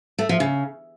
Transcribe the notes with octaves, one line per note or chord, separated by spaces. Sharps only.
A3
F3
C#3